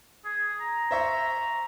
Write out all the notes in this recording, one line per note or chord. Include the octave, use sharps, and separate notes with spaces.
G#4
A#5
C5 E5 C#6